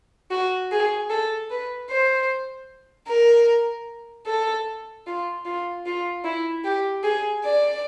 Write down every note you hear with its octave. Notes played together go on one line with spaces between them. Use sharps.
F#4
G#4
A4
B4
C5
A#4
A4
F4
F4
F4
E4
G4
G#4
D5